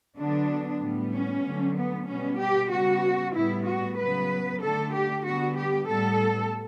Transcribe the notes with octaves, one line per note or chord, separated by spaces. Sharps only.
D3 F#3 B3 D4
A2 G3 B3
C#4
D3 F#3 A3
B3
B2 G3 B3 C#4
G4
C#3 G3 B3 F#4
A2 G3 B3 E4
F#4
C#3 F#3 B3 B4
D3 A3 A4
G4
D3 G3 B3 F#4
G4
A2 G3 B3 A4